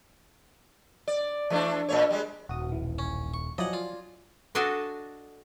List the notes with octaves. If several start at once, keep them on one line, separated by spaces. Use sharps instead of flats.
D5
E3 A3 D4
A#2 A3 C#5
G3 G#3
D#1 F#4 D#6
B1 E3
C#4
C#6
F3 F#3 E4 D5 D#5 F#5 G#5
F4
D4 F#4 A4 D#5 G#5 A5